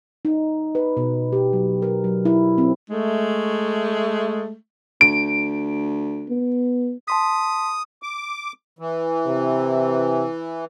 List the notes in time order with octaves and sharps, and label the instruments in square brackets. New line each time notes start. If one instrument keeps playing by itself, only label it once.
[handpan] D#4
B4
B2
G4
F#3
A#4
F#3
E4
C4
[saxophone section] G#3 A3
[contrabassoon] D2 [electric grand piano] D7
[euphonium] B3
[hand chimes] A5 C6 B6 [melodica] D#6
[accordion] D6
E3
[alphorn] C3